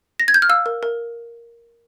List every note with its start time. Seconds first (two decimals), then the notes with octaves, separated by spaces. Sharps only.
0.20 A#6
0.28 G#6
0.34 G6
0.42 F6
0.49 F5 E6
0.66 A#4
0.83 A#4